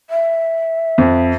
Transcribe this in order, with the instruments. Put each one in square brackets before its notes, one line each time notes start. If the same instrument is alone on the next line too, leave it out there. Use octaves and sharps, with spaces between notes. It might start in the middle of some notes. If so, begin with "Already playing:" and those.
[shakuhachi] E5
[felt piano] F2